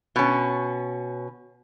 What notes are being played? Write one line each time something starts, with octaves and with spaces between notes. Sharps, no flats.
B2 C#4